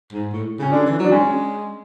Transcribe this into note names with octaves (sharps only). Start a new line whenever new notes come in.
G#2
A2
C#3 C#4
D3 D4
E3
F#3
D4
G#3 C#4